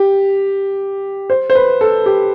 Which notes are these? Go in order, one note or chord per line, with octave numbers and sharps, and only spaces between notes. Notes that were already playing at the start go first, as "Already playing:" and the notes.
Already playing: G4
C5
C5
B4
A4
G4